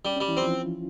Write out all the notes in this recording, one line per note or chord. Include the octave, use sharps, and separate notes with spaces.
G3 C#4
G3 C#4
E3 E4
F3 C4 F4